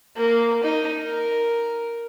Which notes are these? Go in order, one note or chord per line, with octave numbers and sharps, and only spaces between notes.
A#3
D#4
A#4